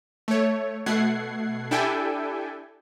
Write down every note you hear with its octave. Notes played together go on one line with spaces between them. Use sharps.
A3 C#5
B2 A3 F#5 G#6 C7
D4 E4 G4 A4 G5 G#5